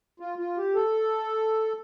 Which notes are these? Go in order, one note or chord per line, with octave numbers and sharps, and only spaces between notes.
F4
F4
G4
A4